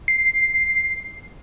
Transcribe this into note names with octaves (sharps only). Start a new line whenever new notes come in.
C7